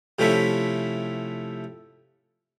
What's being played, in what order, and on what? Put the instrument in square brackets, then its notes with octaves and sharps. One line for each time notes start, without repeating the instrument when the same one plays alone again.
[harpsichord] C3 F3 A3 C#4 E4 E5